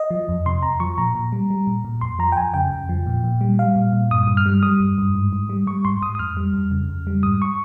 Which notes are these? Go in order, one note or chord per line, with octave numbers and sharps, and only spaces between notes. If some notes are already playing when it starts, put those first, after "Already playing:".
Already playing: D#5
F3
F2
C3 C6
F2 A#5
F3 C#6
A#2 A#5
A#2
G3
G3
A#2
A#2
F2 C6
F3 A#5
G5
F2 G#5
C#3 G5
F2
F3
A#2
A#2
G3
G3 F5
A#2
A#2
G2 D#6
G2
F6
G3
G3 D#6
G2
G2
G#2
G#2
G3
G3 C#6
G#2 C6
G#2 D#6
D#6
F2 F6
G3
F2
C#3
F2
G3
G#2 D#6
C#6